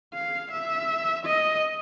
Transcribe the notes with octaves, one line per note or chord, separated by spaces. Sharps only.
F5
E5
D#5